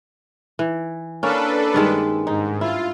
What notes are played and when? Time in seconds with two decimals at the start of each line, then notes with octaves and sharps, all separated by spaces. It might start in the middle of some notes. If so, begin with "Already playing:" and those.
0.59 E3
1.23 A#3 C#4 D4 A4 B4
1.74 G2 D#3 G#3
2.27 G#2 D#4
2.61 E4 F4